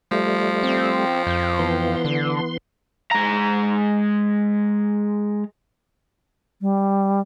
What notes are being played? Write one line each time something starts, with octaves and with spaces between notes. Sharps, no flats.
F3 G3 A3
C4
F2 G5
E3 B3 C6
D3
G#3 A#5
G3